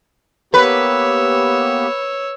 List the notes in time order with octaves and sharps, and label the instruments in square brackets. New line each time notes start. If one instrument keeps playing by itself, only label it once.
[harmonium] A#3 B3 G4 [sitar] B4 [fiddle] C#5 E6